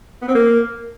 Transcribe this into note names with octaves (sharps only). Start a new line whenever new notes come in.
B3
C4
A#3